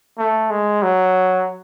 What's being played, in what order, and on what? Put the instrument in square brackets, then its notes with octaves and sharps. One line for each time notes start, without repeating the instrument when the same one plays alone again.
[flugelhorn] A3
G#3
F#3